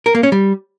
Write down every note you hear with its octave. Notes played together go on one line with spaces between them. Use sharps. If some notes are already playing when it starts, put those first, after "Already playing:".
A#4
A#3
C#4
G3